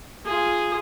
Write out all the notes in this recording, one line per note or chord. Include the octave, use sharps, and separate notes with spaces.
F4 G#4